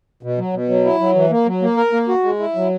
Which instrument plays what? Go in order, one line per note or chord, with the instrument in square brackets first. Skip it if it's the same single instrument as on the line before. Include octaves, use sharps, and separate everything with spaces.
[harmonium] B2
F#3
B2
F#3
E4
F#3
E3
A#3
F#3
A#3
A#4
A#3
F#4
G#3
E4
F#3